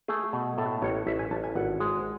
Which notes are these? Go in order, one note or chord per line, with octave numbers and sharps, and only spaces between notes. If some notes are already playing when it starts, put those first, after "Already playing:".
A3 G#4
B2
A2 A4
A1 C#5
A1 E5
G#5
A1 A5
G#5
G#1 F#5
G#3